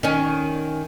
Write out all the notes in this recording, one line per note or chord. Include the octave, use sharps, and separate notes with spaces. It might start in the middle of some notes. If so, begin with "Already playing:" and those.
D#3 C#4